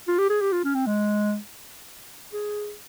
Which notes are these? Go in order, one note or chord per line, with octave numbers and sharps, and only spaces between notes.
F4
G4
G#4
G4
F4
C#4
C4
G#3
G#4